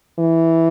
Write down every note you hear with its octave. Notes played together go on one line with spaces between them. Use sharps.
E3